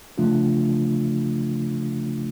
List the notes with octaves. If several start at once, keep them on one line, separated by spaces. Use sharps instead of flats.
C#3 F3 A3 D4 F4